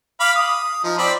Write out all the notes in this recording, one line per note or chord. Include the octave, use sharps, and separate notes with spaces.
F5 B5 D6
D#6
F3 D#4
C4 D5 B5